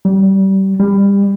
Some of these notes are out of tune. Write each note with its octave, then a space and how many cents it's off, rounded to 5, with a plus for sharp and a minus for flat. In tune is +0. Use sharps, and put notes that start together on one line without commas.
G3 -25
G3 +25